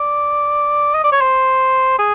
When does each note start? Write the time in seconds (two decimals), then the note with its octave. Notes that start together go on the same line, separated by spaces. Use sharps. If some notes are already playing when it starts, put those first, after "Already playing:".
Already playing: D5
0.94 D#5
1.04 D5
1.13 C#5
1.21 C5
1.99 G#4